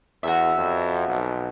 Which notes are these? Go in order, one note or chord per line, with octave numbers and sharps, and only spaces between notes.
E2 F#4 E5
F2
B1